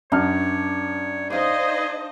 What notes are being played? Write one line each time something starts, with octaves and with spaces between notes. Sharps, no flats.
F#2 D4 C#5 F6
D#4 G#4 C5 D5 D#5 F5